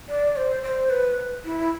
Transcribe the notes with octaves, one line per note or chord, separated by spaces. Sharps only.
D5
C5
C5
B4
E4